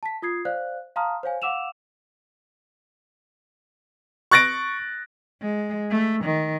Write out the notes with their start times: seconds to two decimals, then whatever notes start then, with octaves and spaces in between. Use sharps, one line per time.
0.03 A5 B6
0.22 F4 D#6 G#6 C7
0.45 C5 D5 F5 F#6
0.96 F5 A5 A#5 C6 D#6 F6
1.23 C5 C#5 F5 G#5
1.42 F5 F#5 D6 E6 E7 F7
4.31 C#6 F#6 A6 A#6 D7
5.41 G#3
5.91 A3
6.25 D#3